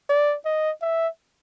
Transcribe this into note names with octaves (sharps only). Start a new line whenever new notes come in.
D5
D#5
E5